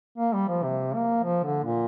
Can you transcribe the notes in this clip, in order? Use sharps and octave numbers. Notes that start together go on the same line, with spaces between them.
A#3
G3
F3
C3
A#3
F3
D3
A#2